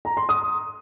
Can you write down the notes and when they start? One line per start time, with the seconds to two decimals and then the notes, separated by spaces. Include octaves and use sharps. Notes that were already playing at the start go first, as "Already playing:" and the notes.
0.05 A#5
0.17 C6
0.29 D#6